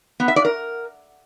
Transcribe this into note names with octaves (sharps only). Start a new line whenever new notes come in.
B3
E5
D5
A#4